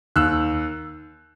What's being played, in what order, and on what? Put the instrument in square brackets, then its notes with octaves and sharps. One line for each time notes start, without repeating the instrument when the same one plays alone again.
[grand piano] D#2 E6 F#6